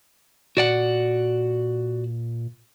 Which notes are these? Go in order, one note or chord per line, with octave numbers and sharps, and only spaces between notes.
A#2 F#4 D5 F#5